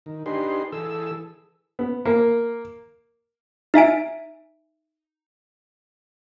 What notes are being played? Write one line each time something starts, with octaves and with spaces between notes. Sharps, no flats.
D#3
D4 D#4 G4 G#4 B4 C6
E3 G#4 A4 E6
B3
A#3
D#4 E5 G#5 D7